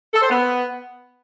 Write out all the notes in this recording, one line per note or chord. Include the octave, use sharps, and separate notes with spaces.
A4
C5
B3